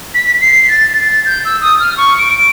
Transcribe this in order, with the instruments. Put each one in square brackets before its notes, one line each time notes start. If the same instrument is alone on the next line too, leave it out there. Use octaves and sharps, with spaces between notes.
[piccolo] B6
C7
A6
A6
G6
E6
D#6
F6
C#6
D7